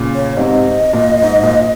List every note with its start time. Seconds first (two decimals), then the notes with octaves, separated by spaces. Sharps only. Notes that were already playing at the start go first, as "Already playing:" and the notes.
Already playing: A#2 C#3
0.15 C#5
0.37 G#2 C3 D#5
0.93 A#2
1.22 G#2
1.43 A#2